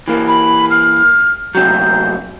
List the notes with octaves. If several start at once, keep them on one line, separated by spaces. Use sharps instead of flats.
E3 A#3
B5
F6
F#2 C3 F#3 G6